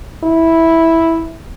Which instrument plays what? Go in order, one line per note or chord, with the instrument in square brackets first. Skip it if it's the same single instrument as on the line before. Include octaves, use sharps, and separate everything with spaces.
[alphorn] E4